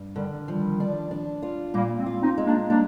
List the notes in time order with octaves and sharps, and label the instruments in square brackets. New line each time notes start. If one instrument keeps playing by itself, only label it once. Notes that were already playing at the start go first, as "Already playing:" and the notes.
Already playing: [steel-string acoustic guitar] G2
[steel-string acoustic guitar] D3 [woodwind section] D#3 G3
[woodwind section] D#3 G3 [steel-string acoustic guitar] F3
[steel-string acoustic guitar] D4
D4
F4
[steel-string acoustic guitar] A#2 [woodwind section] G3 A#3
[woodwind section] G#3 C4
[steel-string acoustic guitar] F4
[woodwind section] C4 D#4
[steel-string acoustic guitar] G#3
[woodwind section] A#3 D4
[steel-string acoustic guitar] G3 [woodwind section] A#3 D4